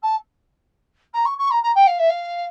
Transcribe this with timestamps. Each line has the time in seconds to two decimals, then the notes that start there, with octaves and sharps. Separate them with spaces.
0.02 A5
1.13 A#5
1.25 C#6
1.38 C#6
1.50 A#5
1.63 A#5
1.75 G5
1.87 F5
1.98 E5
2.09 F5